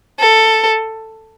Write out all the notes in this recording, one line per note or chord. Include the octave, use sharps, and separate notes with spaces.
A4